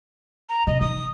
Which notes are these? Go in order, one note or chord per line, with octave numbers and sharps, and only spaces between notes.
A#5
C3 D#5
D#3 D#6